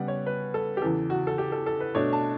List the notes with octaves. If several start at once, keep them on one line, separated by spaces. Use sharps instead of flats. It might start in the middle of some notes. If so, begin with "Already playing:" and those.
Already playing: C#3 G3 B3 F#5
C#5
B4
A4
G4
E2 C#3 E3 A4
F#4
A4
G4
A4
A4
B4
B2 A3 D4 C#5
A5